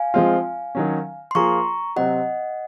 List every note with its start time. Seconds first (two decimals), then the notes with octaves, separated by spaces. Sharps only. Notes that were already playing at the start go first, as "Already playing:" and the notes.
Already playing: F5 G#5
0.14 F3 G#3 C4 F4
0.75 D#3 F#3 C#4
1.31 C6
1.35 F3 A#3 F4 G#4 A#5 C#6
1.96 C3 F#3 C4 F#4 D#5 F#5